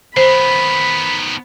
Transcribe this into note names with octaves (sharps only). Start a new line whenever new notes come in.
D#3 B3 C5 B5